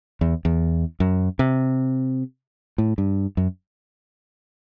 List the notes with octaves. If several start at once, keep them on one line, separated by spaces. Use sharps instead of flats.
E2
E2
F#2
C3
A2
G2
F#2